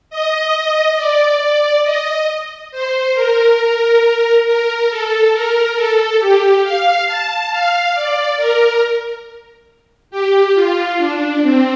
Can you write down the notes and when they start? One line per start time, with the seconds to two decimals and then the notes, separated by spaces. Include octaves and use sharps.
0.10 D#5
0.97 D5
1.83 D#5
2.71 C5
3.14 A#4
4.46 A#4
4.89 A4
5.32 A#4
5.75 A4
6.20 G4
6.63 F5
7.06 A5
7.50 F5
7.94 D5
8.37 A#4
10.11 G4
10.55 F4
10.98 D4
11.43 C4